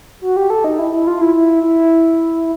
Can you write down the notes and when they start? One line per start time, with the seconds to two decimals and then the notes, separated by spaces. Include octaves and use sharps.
0.21 F#4
0.37 G4
0.50 A4
0.64 D#4
0.79 E4
0.93 E4
1.07 F4
1.21 E4
1.35 E4
1.63 E4